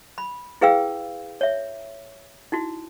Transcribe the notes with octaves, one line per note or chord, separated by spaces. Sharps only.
B5
E4 G#4 B4 F5 G5 E6
C#5 E5
D#4 E4 F#4